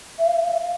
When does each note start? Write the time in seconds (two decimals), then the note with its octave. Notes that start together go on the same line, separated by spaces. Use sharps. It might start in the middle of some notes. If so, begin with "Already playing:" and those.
0.18 E5
0.26 F5
0.34 E5
0.43 F5
0.51 E5
0.60 F5